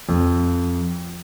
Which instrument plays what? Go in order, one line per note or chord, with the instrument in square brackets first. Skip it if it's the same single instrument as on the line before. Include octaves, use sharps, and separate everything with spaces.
[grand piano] F2